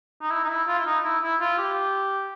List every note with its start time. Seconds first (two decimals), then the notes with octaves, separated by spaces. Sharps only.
0.21 D#4
0.31 E4
0.44 D#4
0.49 E4
0.68 F4
0.79 E4
0.86 D#4
1.04 E4
1.22 E4
1.40 F4
1.58 G4